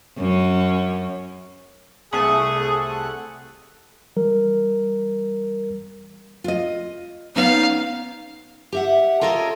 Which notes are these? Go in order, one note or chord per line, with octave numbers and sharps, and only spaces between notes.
F#2 C#4
C2 A3 G#4 F#5
E3 G3 A#4
F4 D#5
B3 C#4 D#4 F5
G4 E5 F#5
F4 A4 A#4 C#5 D#5